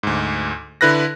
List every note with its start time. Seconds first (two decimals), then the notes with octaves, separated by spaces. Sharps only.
0.03 D2 G#2
0.81 D3 E4 B4 F#6 A#6